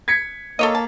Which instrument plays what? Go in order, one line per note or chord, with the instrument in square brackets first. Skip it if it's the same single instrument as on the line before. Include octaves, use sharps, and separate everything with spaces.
[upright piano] G#6 B6 C#7
[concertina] A#3 [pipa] A4 C#5 D#5
[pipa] A5